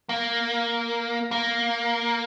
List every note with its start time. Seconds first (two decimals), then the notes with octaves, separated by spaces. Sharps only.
0.09 A#3
1.31 A#3